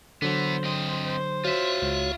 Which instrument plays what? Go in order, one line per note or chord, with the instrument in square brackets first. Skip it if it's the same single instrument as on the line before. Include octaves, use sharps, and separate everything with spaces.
[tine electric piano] D3 F#3 [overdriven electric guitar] E3 B3 [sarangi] C5
[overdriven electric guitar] C4 D#5
[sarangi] C5
[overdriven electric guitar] F4 E5 [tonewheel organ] F#4 C#5
[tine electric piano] C#2